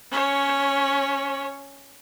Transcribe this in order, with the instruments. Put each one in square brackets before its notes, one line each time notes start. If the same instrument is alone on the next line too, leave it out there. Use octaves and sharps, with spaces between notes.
[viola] C#4 C#5